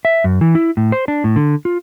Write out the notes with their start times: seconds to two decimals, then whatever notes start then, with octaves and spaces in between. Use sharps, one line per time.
0.05 E5
0.24 F#2
0.41 E3
0.55 E4
0.77 A2
0.92 C5
1.08 D4
1.24 A2
1.36 D3
1.65 F4